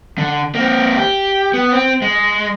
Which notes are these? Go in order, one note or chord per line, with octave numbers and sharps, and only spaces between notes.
D3
A#3 C4
G4
B3
C4
G#3